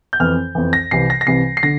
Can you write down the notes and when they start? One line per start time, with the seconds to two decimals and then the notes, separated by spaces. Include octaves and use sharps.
0.13 G6
0.20 F2 E3 F6
0.55 F2 E3
0.73 A#6
0.91 C2 C3 E3 C7
1.10 A#6
1.21 A#6
1.27 C2 C3 E3 C7
1.57 C7
1.63 D3 A#6